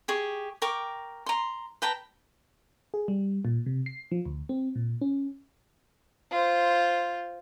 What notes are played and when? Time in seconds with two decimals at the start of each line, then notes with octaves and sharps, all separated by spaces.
0.08 G4 G#4 C#6
0.62 A#4 G5 C#6 D6
1.26 A#5 C6
1.82 B4 G5 A5 A#5
2.94 G#4
3.08 G3
3.45 A#2
3.66 C3
3.86 C7
4.11 F3
4.25 D2
4.49 C4
4.76 A#2
5.01 C#4
6.31 F4 C5